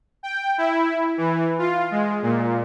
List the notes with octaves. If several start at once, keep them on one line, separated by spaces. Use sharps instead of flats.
G5
E4
E3
F4
G#3
A#2